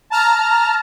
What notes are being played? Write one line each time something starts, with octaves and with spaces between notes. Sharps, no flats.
A5 A#5 F6